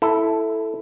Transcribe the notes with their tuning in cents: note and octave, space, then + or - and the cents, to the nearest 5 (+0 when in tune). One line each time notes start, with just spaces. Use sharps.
E4 +0 A4 +0